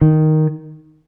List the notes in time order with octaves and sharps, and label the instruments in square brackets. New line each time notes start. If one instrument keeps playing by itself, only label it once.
[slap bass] D#3